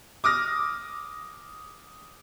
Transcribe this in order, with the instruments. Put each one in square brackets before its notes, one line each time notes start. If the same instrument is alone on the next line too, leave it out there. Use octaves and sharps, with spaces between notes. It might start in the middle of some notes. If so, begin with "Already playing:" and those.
[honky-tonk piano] D6 D#6 F6 A#6